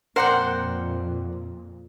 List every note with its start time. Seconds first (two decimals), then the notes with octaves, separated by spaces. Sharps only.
0.16 F2 A#2 A#4 C5 D5 F#5 G5